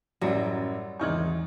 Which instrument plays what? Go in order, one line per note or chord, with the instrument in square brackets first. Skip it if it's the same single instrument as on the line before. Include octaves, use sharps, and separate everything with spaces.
[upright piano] A1 F#2 [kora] F#3 G3
[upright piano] G#1 D#4 C#6 [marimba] E2 C#3 E3